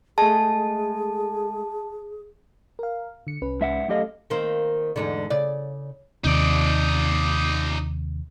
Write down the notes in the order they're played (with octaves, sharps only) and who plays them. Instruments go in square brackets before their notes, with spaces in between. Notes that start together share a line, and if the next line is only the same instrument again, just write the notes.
[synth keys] G#3 A3 [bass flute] G#4 [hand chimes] A5
[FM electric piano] A#4 F5
D3 C#7
C2 C#4 B4
[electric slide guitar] G#2 E5 F#5
[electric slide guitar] F#2 G4 D#5 [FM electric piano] A3 A4 F5
[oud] D#3 A#3 C4
E2 G#2 D3
C#3 D5
[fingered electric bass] D#2 C3 [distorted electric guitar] D#4 D5